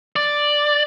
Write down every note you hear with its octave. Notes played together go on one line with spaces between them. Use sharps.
D5